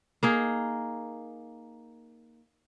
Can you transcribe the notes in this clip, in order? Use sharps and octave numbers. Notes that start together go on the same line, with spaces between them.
A#3 D#4 G#4